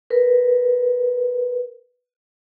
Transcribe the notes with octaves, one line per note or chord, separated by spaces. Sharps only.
A#4 B4